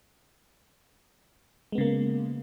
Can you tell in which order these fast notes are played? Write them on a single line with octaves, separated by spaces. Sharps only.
G#3 B3 C#3 A#3